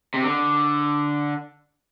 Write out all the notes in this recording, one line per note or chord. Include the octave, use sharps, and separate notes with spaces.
C3
D3